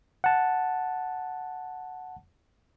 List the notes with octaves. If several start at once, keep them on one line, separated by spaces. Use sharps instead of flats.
F#5 A5